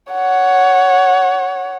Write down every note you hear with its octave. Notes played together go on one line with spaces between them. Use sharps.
C#5 F#5